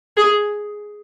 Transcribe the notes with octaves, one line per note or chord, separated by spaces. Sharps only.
G#4